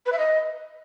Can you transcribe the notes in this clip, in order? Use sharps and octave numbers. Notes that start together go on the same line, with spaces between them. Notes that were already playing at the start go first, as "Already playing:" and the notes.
B4
E5
D#5